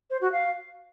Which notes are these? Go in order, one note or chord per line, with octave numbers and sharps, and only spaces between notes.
C5
F#4
F5